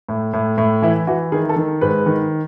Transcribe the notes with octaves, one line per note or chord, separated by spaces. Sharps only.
A2
A2
A2
E3 E4
E3 F#4
D#3 G#4
A4
D#3
G#2 B4
D#3